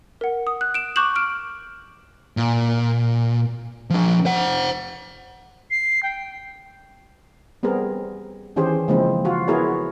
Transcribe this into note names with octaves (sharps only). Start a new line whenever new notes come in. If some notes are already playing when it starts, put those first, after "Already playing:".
A#4 F#5
D#6
F#6
D7 E7
C#6 D6 F#6 G6 E7 F#7
F6 D7
A#2
F3 D4
C5 F#5
C7
G5
G3 B3 C4 G#4 A#4
D#3 E3 C#4 G4 G#4 C5
C#3 F3 G#3 A#3 C4 E4
F4 F#4
B3 E4 F#4 G#4 A#4 C#5